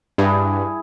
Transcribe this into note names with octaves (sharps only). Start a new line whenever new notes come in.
G2 E4 G#4